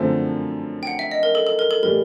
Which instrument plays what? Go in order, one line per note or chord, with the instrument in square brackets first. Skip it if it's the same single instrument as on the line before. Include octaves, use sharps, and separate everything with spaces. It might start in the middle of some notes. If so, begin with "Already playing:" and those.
Already playing: [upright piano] F#2 D3 F3 A3 C4
[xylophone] G5
F#5
E5
D#5
A#4
A4
A4
A#4
A4
[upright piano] A2 E3 G3 [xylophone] A#4